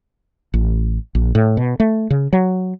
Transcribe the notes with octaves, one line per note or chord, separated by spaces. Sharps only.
A1
A#1
A2
B2
A3
C#3
F#3